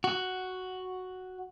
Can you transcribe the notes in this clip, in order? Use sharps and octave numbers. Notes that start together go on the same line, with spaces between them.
F#4